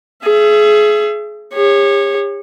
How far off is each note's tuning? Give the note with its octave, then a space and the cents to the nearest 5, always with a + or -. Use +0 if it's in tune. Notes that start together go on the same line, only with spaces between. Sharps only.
G#4 +25 E5 +35
G4 +45 C#5 -15